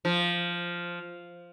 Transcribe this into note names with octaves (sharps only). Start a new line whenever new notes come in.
F3